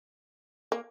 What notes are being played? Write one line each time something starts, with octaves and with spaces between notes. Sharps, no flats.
A#3